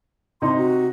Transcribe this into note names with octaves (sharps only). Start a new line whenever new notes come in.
C3 D#4 C6
F#4